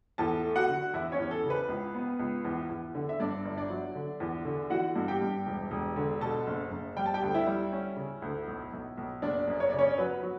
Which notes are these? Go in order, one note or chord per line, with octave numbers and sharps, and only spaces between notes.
E2 A4 A5
A3
F#4 F#5
D3
E2 E4 E5
C#4 C#5
E2
A4
C#3
B4
C#2
B3
C#2
E2
E2
D3
E5
G2 D4 D5
G1
D4 D5
F#3
D3
E2
D3
E3 F#4 F#5
G2
G4 G5
G2
E1
E1
D3
B2 A4 A5
F#1
F#1
G3 G5
A5
G4 G5
D2
E4 E5
G3
C#4
C#3
D2
B1
B1
B1
F#1 D4 D5
F#2
C#5
C#3 D5
C#4 C#5
F#3 B4
F#3